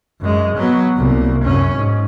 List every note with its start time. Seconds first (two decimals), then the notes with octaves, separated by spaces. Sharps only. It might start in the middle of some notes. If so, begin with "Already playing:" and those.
0.21 F#2 G#3
0.56 F#3 B3
0.97 C2 A#3
1.44 F#2 C#4
1.75 G#2